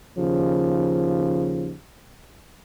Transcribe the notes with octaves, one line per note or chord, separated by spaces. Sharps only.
D#2 C#3 F3